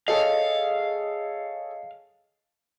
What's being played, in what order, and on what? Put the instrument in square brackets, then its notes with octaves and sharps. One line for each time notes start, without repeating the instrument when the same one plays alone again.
[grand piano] G#4 A4 C#5 [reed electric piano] D#5 [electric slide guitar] F5